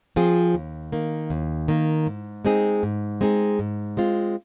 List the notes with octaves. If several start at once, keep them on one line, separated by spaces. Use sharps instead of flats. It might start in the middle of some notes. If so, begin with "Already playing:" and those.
F3 C4 F4 G#4
D#2
D#3 A#3
D#2
D#3 A#3
G#2
G#3 C4 D#4 G#4
G#2
G#3 C4 D#4 G#4
G#2
G#3 C4 F4